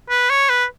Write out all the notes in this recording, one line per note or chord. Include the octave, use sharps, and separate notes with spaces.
B4
C#5
B4